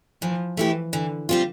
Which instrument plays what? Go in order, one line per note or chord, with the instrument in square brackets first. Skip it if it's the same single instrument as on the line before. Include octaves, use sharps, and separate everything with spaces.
[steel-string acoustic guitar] E3 [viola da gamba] F3
[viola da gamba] E3 [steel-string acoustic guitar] A3 E4 G4
[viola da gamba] D3 [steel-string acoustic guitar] E3
[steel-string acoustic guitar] G3 C4 F4